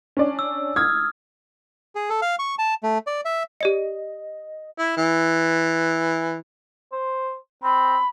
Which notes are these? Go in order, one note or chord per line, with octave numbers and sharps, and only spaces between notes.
C#4 D4 D5
E6
D#6 F6 G#6
G#4
A4
F5
C#6
A5
A3
D5
E5
G4 D5 D#5 C#7
E4
E3
C5
C4 B5